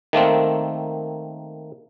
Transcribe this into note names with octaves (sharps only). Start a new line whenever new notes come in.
D#3 A3 A#3 C4